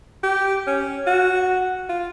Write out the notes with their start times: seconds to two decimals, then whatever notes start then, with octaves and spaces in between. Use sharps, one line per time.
0.23 G4
0.67 C#4
1.06 F#4
1.89 F4